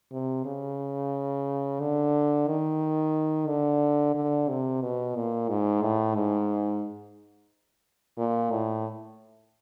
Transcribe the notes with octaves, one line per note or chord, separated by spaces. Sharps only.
C3
C#3
D3
D#3
D3
D3
C3
B2
A#2
G#2
A2
G#2
A#2
A2